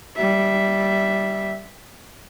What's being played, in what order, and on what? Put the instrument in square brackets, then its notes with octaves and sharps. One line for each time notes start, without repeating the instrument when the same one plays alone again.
[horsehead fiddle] G3 E5